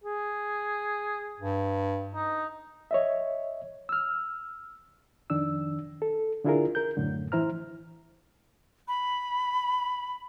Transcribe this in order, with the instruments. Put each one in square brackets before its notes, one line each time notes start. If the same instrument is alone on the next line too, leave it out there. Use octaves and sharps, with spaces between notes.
[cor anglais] G#4
[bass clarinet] G2
[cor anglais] D#4
[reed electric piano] C#5 D#5 E5
E6 F6
F2 D#3 D4 E6
A4
D3 D4 E4 F4 G#4 A#4
A#4 G6
F#2 A2 D3
E3 E4 C5 A#5 F6
[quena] B5